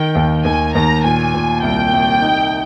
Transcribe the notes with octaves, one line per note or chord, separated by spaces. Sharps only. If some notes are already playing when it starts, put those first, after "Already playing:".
Already playing: D#3 G5
D#2
D#2 G#5
D#2 A#5
A#2 G#5
A#2
C2 G5
C2
D#4